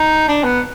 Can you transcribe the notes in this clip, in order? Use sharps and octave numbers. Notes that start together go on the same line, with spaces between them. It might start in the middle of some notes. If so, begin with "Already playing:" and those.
Already playing: D#4
D4
B3